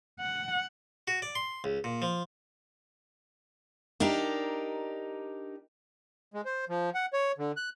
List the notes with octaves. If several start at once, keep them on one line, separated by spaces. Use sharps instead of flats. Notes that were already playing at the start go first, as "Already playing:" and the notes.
F#5
F#4
D5
C6
C#2
A#2
F3
D4 D#4 G4 A#4
G#3
C5
F3
F#5
C#5
D3
F#6